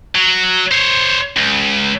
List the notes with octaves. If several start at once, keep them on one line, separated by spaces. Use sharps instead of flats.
F#3
C5 C#5
C#2